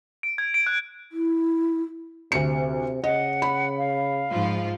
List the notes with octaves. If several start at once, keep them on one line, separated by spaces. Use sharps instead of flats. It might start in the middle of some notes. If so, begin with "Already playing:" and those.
D7
G#6
D7
F#6
E4
D2 C3 C#7
C#3 D#5 F#5
B5
F5
G#2 F3 F4